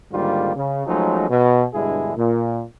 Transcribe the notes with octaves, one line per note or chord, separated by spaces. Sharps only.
G#2 D3 D#3 G3 A#3 F4
C#3
F3 F#3 G#3 A3 C#4 D#4
B2
G2 B2 D3 G#3 E4 G#4
A#2